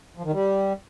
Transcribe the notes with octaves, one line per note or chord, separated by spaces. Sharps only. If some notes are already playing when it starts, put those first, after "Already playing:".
F3
D#3
G3